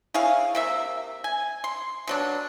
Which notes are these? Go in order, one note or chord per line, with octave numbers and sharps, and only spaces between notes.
E4 G#4 C#5 F5
C3 A#3 E5
G#5
C6
B2 F#3 D4